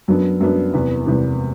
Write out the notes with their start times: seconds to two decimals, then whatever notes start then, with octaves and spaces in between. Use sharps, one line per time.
0.08 F#2 F#3 B3 D4
0.40 F#2 F#3 B3 D4
0.73 E2 C3 E3 B3
1.06 E2 C3 E3 B3